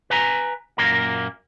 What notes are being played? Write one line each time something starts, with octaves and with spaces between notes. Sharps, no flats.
B4 G#5 A#5
F#2 A#2 A#3 A#4